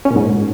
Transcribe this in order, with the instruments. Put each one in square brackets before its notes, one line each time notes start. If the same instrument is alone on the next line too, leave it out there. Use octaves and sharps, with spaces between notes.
[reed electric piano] C#4
A#2
G#2